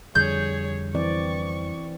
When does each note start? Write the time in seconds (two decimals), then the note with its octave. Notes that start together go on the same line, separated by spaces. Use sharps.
0.15 F2 D3 G3 G#4 C#5 G6
0.95 E3 C4 D5 C#6